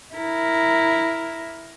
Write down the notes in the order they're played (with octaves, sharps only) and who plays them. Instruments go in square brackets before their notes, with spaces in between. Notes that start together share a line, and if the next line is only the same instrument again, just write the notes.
[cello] E4 A#4